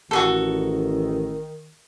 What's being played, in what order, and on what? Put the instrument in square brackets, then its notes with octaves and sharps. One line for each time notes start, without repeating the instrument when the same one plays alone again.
[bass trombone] A1 [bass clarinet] D#3 [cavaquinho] F#4 G#4 A4